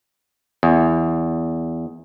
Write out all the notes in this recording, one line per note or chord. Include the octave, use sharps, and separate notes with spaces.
E2